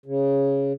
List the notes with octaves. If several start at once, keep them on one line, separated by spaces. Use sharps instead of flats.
C#3